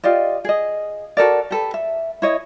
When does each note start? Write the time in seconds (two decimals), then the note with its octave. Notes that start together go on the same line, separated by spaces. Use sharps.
0.04 F4 G4 D5 D#5
0.45 G#4 D#5
1.17 F#4 A4 A#4 D5
1.51 G4 A4 B4
1.74 E5
2.22 E4 C#5 D#5